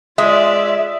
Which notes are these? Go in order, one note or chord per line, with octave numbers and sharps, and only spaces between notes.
G#3 F4 D5 E5